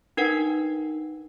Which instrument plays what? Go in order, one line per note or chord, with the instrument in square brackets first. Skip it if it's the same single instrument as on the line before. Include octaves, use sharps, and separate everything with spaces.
[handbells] D4 D#4 A#4 B4 F#5